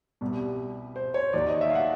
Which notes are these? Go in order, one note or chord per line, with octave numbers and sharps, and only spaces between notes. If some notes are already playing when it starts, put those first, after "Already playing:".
C2 B2 G3
C5
C#5
D#2 D#3 F#3 D5
D#5
E5
F5
F#5